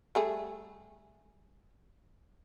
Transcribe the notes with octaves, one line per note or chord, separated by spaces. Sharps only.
G3 A3 G#4